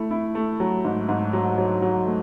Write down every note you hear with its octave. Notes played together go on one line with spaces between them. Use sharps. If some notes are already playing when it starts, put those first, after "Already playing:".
Already playing: A3 E4
E4
A3
F#3
G#2
G#2
F#3
F#3
F#3
A3